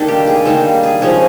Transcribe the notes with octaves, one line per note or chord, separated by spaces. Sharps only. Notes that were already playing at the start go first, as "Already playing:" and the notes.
Already playing: D#3 G3 A#3 D4 A4
G4
G#4
D#3 G3 A#3 D4 A4
G#4
F3 G#3 C#4 G#4